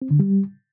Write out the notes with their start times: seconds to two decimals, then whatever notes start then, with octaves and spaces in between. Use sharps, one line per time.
0.02 C4
0.11 D3
0.20 G3